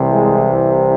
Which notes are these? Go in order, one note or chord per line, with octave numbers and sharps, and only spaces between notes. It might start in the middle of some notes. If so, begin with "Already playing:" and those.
Already playing: C2 C3 E3
G#3